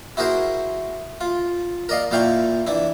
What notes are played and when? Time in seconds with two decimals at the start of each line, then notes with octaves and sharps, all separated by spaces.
0.17 E4 F#4 G#4 A#4 C5
1.21 F4
1.89 A#4 D5 D#5 F5
2.11 A#2 A#3 E4 F5 G5 C#6
2.67 E3 D4 E4